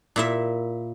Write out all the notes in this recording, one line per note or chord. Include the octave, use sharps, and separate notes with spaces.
A#2 E4 E5